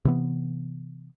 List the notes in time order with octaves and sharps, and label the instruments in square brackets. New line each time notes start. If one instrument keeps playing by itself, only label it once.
[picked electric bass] C3 E3 B3